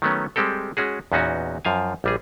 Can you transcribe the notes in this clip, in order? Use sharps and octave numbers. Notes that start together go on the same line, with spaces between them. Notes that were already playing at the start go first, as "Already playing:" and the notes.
D#3 F#3 A3 B3 C#4
G3 G#3 C4 G4 A4
G#3 C#4 F#4 G#4
E2 A#2 B3 C#4 D#4 F#4
F#2 F3 F5 G#5
A#1 G3 G#4